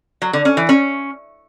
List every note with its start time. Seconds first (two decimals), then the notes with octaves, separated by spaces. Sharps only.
0.22 F#3
0.33 D3
0.45 C#4
0.57 E3
0.69 C#4